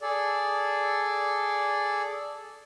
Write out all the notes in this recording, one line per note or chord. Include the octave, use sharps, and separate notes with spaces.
G#4 A4 D5